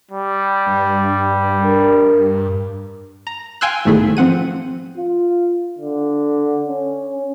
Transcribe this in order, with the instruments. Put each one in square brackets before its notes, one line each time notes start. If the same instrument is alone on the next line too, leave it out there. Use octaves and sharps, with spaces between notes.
[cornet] G3
[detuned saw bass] G2
[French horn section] D4 A#4
[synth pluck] A#5
F5 G5 G#5 C6 E6 F#6
B1 G#2 D#3 A3 E4 G#4
F3 C4 F#5 D#7
[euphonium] F4
D3
C#4